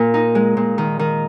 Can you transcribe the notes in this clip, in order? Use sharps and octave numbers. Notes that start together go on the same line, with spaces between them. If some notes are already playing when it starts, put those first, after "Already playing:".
Already playing: A#2
D#4
G#3
A#2
D#3
D#3